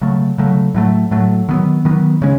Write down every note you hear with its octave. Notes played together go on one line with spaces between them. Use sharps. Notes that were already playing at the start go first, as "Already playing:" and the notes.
C#3 F#3 A3
C#3 F#3 A3
A2 F#3 A3
A2 F#3 A3
D#3 F#3 B3
D#3 F#3 B3
C#3 G#3 C#4